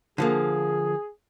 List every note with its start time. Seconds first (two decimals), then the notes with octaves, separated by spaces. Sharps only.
0.18 D3 F3 A#3 G#4